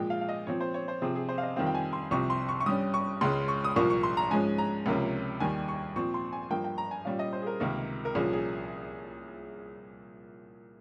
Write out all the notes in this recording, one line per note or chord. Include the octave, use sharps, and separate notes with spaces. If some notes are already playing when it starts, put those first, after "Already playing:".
Already playing: A#2 F3 G#3 G5
F5
F5
D#5
A#2 F3 C4 C#5
C5
C#5
C5
C3 F3 C4 G#4
G#4
C5
F5
D#5
F2 D#3 G3 C4 F5
G5
G#5
C6
C2 C3 F3 C4 C#6
C6
C#6
C#6
G2 G3 C#4 D#6
C#6
C#2 C#3 G#3 C#4 C6
C#6
D#6
C2 A#2 F3 A#3 C#6
C#6
C6
A#5
G#2 F3 G#3 C#4 G#5
A#5
C#2 C3 F3 A#3 C#4
D#2 D#3 G3 G#5
C#6
A#2 F3 C4 C#6
C6
G#5
G2 F3 A#3 G5
G5
A#5
G#5
A#2 G3 C#4 F5
D#5
C5
G#4
A#4
C#2 C3 D#3 A#3
A#4
C2 A#2 F3 A#3 C#4 G#4
G#4